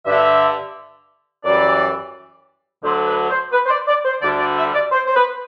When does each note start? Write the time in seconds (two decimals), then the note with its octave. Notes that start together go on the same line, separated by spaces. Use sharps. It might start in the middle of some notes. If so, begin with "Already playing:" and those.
0.06 G2 D3 G3 E5
1.44 F#2 E3 G3 D5
2.84 D2 D3 F#3 C5
3.07 B4
3.30 C5
3.53 B4
3.66 C5
3.70 D5
3.88 D5
4.05 C5
4.22 D2 D3 G3 D5
4.39 D5
4.57 E5
4.74 D5
4.92 C5
5.06 C5
5.15 B4